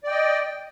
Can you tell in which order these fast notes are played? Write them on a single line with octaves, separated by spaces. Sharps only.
D5 G5 D#5